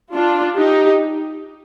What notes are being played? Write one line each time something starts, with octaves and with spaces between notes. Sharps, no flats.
D4 F4
D#4 G4